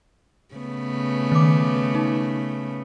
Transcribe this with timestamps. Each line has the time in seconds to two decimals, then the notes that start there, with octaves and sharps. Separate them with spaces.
0.55 C#3 A3 B3
1.32 D#3 D6
1.95 D#4